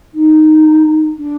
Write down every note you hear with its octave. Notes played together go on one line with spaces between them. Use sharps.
D#4
D4